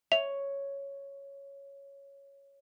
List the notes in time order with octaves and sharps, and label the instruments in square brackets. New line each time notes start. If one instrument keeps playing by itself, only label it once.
[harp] C#5 [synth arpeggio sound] E5 [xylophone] F7